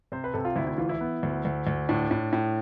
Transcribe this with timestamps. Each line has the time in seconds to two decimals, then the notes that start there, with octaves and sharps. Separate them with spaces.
0.12 C3 C5
0.24 B4
0.34 C3 A4
0.45 F4
0.56 D2 E4
0.67 E4
0.78 E3 F4
0.89 E4
1.01 B3
1.23 D2
1.45 D2
1.67 D2
1.89 A2 D4
2.11 A2
2.33 A2